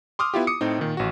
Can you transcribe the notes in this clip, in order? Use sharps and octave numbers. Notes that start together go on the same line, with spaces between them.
C6 D6 D#6 F6
B3 E4 F4 G4
D6 D#6 C#7
A2 C4 D#4
A#2 D#3
A1 F#4